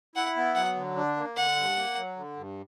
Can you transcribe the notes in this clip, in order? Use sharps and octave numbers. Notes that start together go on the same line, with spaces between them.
E4 F#5
B3
F#3 F#5
D3
D4
A#3
D3 F#5
G2
A#3
F#3
D3
G2